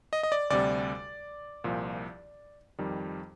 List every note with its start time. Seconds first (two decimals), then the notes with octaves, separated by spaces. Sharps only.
0.13 D#5
0.23 D#5
0.32 D5
0.50 D2 C3 G3 D5
1.64 C2 A#2 F3
2.79 F2 D#3 G3